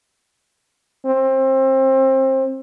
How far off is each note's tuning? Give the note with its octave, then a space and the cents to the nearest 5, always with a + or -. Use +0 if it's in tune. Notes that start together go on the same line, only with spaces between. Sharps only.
C4 +25